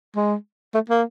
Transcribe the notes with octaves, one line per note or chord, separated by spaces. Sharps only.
G#3
A3
A#3